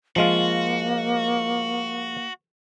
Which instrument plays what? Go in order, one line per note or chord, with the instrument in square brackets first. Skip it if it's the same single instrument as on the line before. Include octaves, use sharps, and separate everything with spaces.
[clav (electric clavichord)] F3 G#3 F4 [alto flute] A#3 [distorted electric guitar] F#4